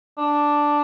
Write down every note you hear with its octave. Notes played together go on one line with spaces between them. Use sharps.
D4